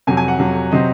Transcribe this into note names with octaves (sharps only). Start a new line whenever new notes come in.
F2 C3 F#3 G#5
G#5
F#5
F2 C3 F#3
C3 F#3 C4 D#5